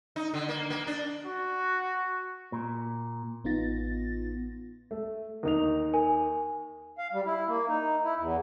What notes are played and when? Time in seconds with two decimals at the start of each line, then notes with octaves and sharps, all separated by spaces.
0.16 D#4
0.34 D3
0.49 A#3
0.70 A#3
0.87 D4
1.26 F#4
2.52 A#2
3.44 A1 B3 D#4 F4 A6 A#6
4.91 A3
5.43 D#2 D#4 F7
5.93 A#4 G#5
6.98 F5
7.13 G3
7.26 E4
7.48 A#3
7.68 D#4
8.04 E4
8.19 E2